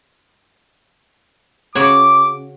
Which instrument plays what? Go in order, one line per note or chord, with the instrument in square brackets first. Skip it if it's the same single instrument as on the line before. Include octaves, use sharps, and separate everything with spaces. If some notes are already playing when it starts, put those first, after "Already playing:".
[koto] C#3 F#4 C#5 [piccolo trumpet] D6